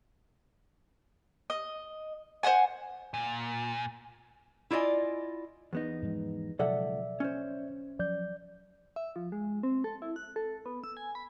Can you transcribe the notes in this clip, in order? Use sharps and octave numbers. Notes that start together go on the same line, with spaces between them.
D#5
C5 C#5 F#5 G#5
A#2
E4 F4 D5 D#5 G#5
E2 B3 D#4
G#2 F3 G#3
C#2 B2 F3 F#3 A4 D5 E5 F#5
C#4 C5
F3 F#3 D5 G6
E5
F3
G#3
C4
A4
E4
F#6
A4
B3
E6
G#5
B5